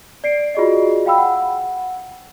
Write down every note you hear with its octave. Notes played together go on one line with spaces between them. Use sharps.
D5 C7 D7
F4 F#4 G#4 D5 D#5
F5 G5 B5 E6
F#5